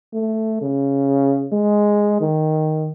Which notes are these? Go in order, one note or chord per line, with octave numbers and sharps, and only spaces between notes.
A3
C#3
G#3
D#3